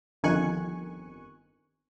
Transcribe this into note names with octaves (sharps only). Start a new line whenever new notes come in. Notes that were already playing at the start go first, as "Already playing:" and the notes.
G1 F2 D#3 G#5 C#6 F#6